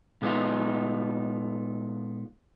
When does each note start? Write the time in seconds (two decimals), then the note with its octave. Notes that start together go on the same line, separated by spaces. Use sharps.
0.22 A#2 G#3 B3 D#4 F4